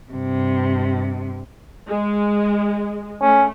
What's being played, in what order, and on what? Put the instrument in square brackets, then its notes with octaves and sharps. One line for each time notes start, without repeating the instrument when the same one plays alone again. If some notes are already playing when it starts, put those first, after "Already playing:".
[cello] G2 C3
[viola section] G#3
[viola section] A3 [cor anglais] C#4